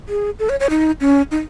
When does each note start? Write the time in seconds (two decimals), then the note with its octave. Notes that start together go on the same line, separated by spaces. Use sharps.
0.09 G#4
0.39 A4
0.49 C#5
0.60 C#5
0.70 D#4
1.01 C#4
1.31 D#4